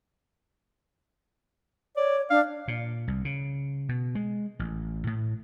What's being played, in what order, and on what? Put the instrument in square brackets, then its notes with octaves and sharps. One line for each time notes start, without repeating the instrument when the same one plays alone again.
[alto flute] C#5 [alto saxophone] D5
[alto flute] D4 [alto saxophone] F5
[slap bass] A#2
C2
C#3
B2
G#3
A1
A2